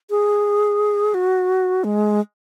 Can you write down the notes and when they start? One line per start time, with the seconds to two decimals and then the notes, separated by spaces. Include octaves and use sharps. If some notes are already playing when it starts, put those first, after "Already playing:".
0.10 G#4
1.14 F#4
1.84 G#3